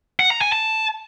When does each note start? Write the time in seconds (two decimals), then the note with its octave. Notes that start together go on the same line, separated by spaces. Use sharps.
0.20 F#5
0.30 A#5
0.41 G#5
0.52 A5